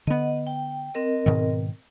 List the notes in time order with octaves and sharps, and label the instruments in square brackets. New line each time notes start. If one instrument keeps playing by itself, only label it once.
[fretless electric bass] D3 B3 [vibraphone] D#5 F#5
[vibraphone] G5
C4 A#4 D#5
[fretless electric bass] G#2 B2 D#3